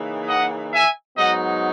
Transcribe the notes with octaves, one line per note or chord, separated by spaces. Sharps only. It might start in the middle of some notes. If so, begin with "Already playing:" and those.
Already playing: C#3 E3 A#3 D#4
D#5 F#5
E5 G#5
G#2 F#3 B3 D#4 D#5 F#5